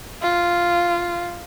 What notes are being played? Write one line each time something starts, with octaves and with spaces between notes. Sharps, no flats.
F4